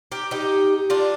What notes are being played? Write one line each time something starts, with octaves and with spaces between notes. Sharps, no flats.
G4 A#4
D#4 G4
D4 F4